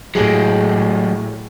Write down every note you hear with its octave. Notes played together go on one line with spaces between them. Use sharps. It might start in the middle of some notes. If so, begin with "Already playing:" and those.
A2 F#3 G#3 G4 G#4